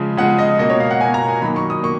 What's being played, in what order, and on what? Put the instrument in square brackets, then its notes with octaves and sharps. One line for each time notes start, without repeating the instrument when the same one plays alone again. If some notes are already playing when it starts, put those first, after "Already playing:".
Already playing: [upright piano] C#3 F3 G#3
C#3 F3 G#3 F#5
D#5
B2 A#3 D#5
C#5
F5
F#5
B2 A#3 G#5
A#5
G#5
D#3 F#3 A#3 B5
C#6
D#6
A#3 C#6